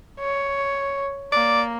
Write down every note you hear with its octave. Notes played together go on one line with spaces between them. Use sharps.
C#5
A#3 D5